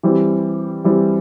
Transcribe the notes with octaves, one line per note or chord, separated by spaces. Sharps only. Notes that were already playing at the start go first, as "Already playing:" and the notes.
E3 G3 C4
E3 G3 C4